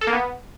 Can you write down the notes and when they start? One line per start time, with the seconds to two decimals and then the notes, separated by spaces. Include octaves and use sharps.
0.01 A4
0.07 A#3
0.13 B3